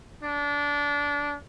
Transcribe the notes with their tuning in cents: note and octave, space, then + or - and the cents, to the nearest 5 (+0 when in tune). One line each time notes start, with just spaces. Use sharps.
D4 -25